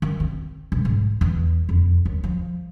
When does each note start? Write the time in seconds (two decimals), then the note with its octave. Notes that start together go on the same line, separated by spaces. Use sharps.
0.02 D#3
0.20 C4
0.72 E1
0.85 G#2
1.21 E2
1.69 F2
2.05 D#2
2.24 F3